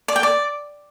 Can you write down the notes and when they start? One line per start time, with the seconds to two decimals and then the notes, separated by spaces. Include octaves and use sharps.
0.08 D5
0.16 G5
0.23 D5